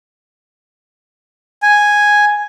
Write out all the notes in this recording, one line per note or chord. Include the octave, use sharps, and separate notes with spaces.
G#5